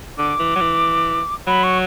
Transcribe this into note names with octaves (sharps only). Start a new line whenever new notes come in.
D3 D6
E3
F#3
E3
F#3 B5
C#6